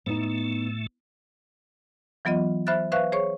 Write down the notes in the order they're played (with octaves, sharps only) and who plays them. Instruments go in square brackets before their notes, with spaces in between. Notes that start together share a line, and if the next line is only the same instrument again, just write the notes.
[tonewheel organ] A2 A3 [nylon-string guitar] B3 D#4
[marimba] E3 F#3 B3 F4 D#5
C5 E5 B5 F6 F#6 A6
B4 C5 E5 F5 C#6 F#6
G#4 C5 C#5 C#6